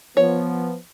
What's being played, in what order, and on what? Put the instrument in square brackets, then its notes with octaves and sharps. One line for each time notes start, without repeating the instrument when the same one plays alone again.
[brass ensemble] F3 B3 [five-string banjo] C#5